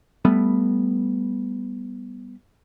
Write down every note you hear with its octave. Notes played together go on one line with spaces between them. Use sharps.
G3 A3 B3